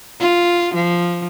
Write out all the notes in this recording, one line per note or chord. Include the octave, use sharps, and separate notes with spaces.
F4
F3